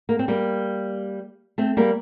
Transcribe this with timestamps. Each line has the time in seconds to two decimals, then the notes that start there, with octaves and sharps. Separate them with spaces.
0.09 A#3
0.19 C4
0.28 G3 A#3
1.58 A3 C4
1.77 G3 A#3